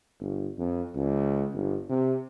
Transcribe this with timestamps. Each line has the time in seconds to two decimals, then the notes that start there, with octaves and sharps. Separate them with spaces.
0.20 G1
0.58 F2
0.95 C#2
1.54 G1
1.90 C3